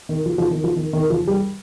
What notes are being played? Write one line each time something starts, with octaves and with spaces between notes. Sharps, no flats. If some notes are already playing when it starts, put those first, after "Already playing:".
D#3
F3
F3
D#3
F3
D#3
D#3
F3
G3